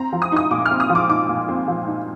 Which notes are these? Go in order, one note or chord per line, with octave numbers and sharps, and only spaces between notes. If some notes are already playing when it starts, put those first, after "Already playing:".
Already playing: C4 A#5
F3
D#6
D#4 D#6
A#2 D6
F6
C4
D#6
F3
D6
D#4 D6
A#2
C4
F3
D#4